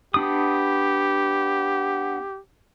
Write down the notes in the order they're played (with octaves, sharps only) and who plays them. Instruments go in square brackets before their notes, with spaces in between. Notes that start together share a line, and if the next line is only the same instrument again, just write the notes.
[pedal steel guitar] B3 D4 D#6 [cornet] G4